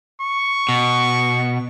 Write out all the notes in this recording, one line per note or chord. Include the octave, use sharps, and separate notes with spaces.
C#6
B2